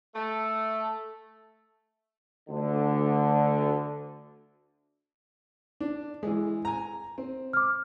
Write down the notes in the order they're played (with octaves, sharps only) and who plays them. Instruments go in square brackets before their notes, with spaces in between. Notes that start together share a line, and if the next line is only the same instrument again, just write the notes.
[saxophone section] A3
[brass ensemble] D2 D3
[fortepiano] D4
E3 G#3
G#5 A#5
C4
[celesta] D6 F6